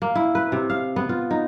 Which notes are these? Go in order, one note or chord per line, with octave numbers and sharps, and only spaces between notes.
A#3
E4
B4
C3
F5
B3
F4
D#4